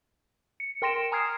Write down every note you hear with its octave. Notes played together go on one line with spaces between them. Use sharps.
C#7
A#4 G5 C6 A#6 D7 E7
G#5 A#5 D#6 F6 G#6 C7